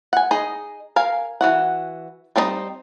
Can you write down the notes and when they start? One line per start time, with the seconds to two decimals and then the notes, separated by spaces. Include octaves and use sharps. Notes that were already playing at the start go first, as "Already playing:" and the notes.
0.13 F#5 G#5
0.31 D#4 G#4 D#5
0.96 A#4 F5 G#5
1.41 E3 F#4 F#5
2.36 G3 C4 D4 D#4 D#5